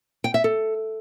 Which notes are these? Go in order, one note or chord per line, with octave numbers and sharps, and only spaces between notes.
G5
E5
A4